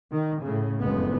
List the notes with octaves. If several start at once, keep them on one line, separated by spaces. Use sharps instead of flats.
D#3
A2 C#3
F#1 F2 G#3 B3